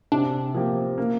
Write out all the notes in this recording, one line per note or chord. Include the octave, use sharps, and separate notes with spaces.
C3 D4
F3 A#3 G4
A#3